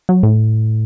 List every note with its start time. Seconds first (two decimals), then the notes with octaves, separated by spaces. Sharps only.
0.09 F#3
0.23 A2